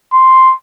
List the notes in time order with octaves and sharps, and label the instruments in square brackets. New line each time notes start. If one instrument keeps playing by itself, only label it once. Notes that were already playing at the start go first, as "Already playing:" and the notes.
[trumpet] C6